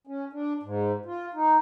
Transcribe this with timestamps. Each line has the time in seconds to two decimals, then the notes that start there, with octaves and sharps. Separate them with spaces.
0.07 C#4
0.33 D4
0.63 G#2
1.05 F4
1.34 D#4